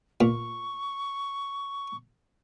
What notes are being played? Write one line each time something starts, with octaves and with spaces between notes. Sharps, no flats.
A#2 C#6